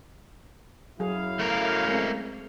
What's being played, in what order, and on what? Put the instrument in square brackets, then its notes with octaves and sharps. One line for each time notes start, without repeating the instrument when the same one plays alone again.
[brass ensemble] F#2 E4 F5 [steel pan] F#3 G#4
[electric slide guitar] A3 A#4
[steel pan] G#3 C4